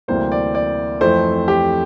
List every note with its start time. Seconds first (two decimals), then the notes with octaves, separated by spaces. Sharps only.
0.08 D2 C3 E3 G3 A#3 C5
0.32 D5
0.55 D5
1.01 F2 E3 A3 C4 C5
1.48 G4